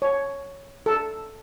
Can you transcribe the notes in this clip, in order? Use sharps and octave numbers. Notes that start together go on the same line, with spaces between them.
C#5
A4